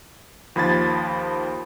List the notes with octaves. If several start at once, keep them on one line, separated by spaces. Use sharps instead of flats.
D#2 F3 B5 G#6 A6